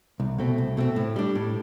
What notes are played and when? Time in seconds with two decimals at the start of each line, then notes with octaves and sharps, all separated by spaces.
0.20 C2
0.38 B2 A3 C4
0.58 C2
0.77 B2 A3 C4
0.96 A2
1.16 G3 D4
1.35 A2